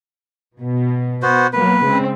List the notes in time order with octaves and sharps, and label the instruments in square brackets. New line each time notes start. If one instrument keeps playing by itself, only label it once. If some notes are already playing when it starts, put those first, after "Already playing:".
[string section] B2
[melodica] B3 F#4 C5
[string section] F#3 A#3 B3 [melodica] B4
[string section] C#3 G#3 C4